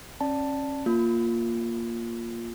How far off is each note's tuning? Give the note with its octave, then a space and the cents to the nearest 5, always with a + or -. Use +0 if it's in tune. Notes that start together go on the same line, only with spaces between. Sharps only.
C#4 -25 D5 +0 A5 +0
A#3 +0 F4 +0